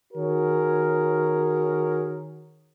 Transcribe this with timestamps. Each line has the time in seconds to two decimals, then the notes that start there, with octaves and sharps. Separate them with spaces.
0.14 D#3 F#4 G#4 A#4 C#5